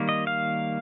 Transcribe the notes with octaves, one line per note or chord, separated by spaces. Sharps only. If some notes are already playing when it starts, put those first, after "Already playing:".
Already playing: D#3 G3 A#3
D#5
F5